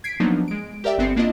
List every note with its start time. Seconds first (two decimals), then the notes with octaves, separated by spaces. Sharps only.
0.04 G#6 B6 C7 D7
0.20 F3 F#3 A#3 B3 D4 D#4
0.48 G#3 D7
0.84 G4 A#4 D5 E5 G5
0.98 G1 B3 C4 C7 C#7
1.16 A#3 D4 E4 F4 D#5